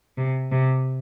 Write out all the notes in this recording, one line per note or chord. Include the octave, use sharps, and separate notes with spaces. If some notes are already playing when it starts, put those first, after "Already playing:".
C3
C3